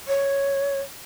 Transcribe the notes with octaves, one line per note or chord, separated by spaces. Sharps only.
C#5